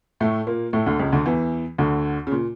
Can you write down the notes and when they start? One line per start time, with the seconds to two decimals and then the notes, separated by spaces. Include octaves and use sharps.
0.20 A2 A3
0.47 A#2 A#3
0.73 A2 A3
0.86 D2 D3
0.99 C#2 C#3
1.12 D2 D3
1.26 E2 E3
1.78 D2 D3
2.27 C#3
2.32 A#2